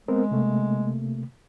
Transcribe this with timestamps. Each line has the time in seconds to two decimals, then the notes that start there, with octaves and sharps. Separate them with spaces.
0.08 G#3 B3 C4 A#4
0.31 C3 A3 A#3